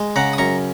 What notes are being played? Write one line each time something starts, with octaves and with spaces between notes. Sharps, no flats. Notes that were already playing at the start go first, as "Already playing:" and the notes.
Already playing: G#3
C#3 F#5 A#5
D#6
F#2 A#5 C#6